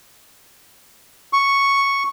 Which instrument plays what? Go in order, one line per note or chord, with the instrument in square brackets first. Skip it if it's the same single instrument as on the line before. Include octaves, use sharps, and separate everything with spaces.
[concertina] C#6